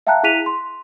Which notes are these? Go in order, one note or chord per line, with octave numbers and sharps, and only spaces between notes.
E5 F5 G5 A5 A#5 F#6
E4 G#4 F#6 B6 D#7 F7
C6